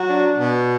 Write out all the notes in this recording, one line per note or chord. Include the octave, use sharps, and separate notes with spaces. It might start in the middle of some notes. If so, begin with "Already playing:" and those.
Already playing: F#3 F#4
D4
B2